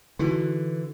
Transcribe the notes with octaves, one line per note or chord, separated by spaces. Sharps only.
D3 E3 D#4 E4 F#4